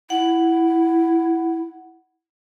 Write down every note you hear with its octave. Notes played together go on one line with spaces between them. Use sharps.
E4 F#5